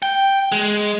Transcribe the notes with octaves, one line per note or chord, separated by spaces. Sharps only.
G5
G#3